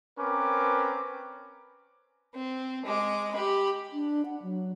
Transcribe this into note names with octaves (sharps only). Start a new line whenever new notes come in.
C4 C#4 A#4 B4 D6
C4
G#3 D6
G4 B5
D4
F#5
F#3